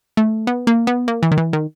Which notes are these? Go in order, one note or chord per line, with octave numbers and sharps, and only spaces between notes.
A3
B3
A#3
B3
A#3
E3
D#3
E3
D#3